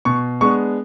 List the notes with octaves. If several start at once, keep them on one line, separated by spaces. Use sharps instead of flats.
B2 C#6
G#3 B3 D4 C#6